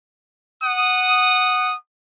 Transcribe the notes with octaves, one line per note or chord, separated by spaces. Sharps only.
F#5 D#6